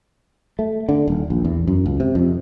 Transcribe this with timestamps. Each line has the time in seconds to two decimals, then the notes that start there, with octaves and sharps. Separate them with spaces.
0.59 A3
0.89 D3
1.08 D#1
1.30 A#1
1.45 E2
1.67 F#2
1.86 C#2
2.00 C3
2.15 F2